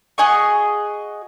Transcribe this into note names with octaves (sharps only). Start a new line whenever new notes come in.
F#4 G#4 D#5 C#6